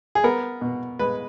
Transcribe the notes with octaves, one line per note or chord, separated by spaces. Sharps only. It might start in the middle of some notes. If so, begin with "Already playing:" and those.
G#4
B3 A#4
B2
G#3 B4